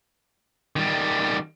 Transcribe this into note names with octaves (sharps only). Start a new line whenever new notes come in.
D#3 G3